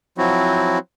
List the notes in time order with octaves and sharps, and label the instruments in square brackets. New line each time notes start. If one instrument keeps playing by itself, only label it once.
[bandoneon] F3 F#3 C4 E4 F#4